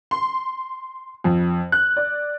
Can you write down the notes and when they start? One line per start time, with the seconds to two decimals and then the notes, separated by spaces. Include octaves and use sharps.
0.11 C6
1.24 F2
1.72 F#6
1.97 D5